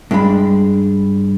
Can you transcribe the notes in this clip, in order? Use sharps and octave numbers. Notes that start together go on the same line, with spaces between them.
G2 G#3 D4 B5